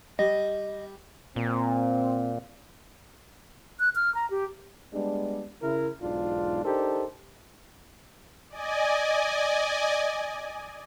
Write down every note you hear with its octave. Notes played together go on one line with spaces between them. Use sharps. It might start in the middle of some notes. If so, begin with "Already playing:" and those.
G3 D#5
A#2 C4
F#6
F6
A#5
G4
G3 G#3 B3 D4
C#3 E4 A#4
B1 E2 G#2 D4 F4
D4 D#4 G4 A4 A#4 C5
D5 D#5 G#5